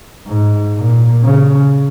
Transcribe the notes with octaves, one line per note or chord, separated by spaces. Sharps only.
G#2
A#2
C#3